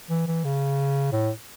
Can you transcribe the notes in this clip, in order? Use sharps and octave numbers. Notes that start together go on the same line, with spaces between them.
E3
E3
C#3
A2